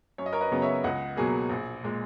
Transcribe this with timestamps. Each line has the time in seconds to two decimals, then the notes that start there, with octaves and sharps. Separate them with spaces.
0.18 F#2 C#5
0.26 D#5
0.33 A#4 C#5
0.41 B4 D#5
0.52 C#3 F#3 B3
0.62 C#5 E5
0.84 C#2 D#5 F#5
1.17 B2 F#3 A#3 G#4
1.49 A#1
1.83 A#2 G#3